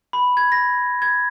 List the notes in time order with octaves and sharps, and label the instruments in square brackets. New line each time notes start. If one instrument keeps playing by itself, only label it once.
[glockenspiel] B5
G#6
A#6
G#6